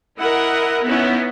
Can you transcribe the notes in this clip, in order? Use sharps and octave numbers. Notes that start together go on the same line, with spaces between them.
E4 A#4 D#5 F#5
B3 C#4 D#4 E4